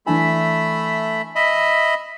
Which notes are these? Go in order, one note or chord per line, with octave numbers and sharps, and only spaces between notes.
E3 A3 D4 E5 G#5 B5
D#5 E5 B5